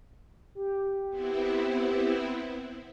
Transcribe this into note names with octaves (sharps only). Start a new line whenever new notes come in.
G4
B3 C4 E4